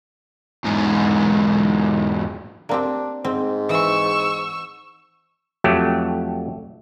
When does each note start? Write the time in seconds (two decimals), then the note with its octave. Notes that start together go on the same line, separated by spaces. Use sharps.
0.64 E2 G#2
2.69 A#3 C4 D4 G4
3.25 G#2 C4
3.69 E3 C#6 E6
5.64 F2 F#3 A3 G4